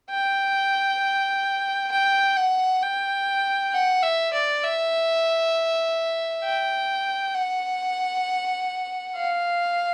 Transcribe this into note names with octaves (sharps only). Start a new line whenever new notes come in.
G5
G5
F#5
G5
F#5
E5
D5
E5
G5
F#5
F5